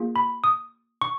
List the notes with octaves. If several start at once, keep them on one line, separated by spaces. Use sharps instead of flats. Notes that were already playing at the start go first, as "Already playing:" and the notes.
Already playing: A#3 F4 G#4
B5
D#6
C#6